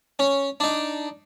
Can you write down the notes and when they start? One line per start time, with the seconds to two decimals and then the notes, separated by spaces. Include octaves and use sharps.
0.19 C#4
0.60 D4 D#4